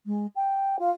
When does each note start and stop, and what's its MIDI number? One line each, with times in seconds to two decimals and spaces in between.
0.06 0.27 56
0.36 0.76 79
0.79 0.91 65